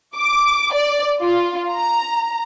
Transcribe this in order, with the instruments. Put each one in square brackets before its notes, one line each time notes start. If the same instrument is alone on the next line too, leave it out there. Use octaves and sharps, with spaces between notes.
[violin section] D6
D5
F4
A#5